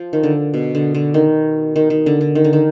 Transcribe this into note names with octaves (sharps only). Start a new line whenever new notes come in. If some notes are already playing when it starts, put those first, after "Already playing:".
Already playing: F3
D#3
D3
B2
D3
D3
D#3
D#3
D#3
D3
D3
D#3
D3
D#3